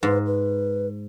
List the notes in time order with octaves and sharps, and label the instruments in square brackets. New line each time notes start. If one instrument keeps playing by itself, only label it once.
[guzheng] G#2 [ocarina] B4
[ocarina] B4